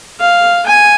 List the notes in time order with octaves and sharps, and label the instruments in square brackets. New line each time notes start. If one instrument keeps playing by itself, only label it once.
[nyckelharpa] F5
G#5